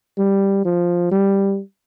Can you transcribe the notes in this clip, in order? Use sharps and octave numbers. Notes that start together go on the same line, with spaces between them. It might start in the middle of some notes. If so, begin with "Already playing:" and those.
G3
F3
G3